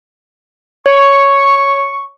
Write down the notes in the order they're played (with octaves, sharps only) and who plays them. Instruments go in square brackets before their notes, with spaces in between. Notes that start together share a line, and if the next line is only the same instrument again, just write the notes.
[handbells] C#5 [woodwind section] C#6